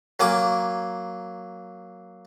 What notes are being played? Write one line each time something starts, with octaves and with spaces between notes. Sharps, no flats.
F#3 A#3 G#5 D6